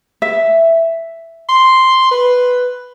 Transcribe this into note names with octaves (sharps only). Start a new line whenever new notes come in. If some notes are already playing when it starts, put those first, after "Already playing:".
E5
C6
B4